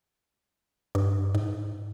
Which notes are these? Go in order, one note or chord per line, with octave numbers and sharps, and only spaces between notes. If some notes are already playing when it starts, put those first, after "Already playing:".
G2
G#2